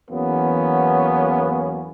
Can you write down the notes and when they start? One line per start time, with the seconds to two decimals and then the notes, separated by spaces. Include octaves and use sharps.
0.11 E2 E3 F#3 A#3 B3 C#4